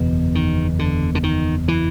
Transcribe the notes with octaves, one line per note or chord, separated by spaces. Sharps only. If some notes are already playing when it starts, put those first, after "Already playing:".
Already playing: F#1 E2 B2
D#3
D3
D3
D#3
E3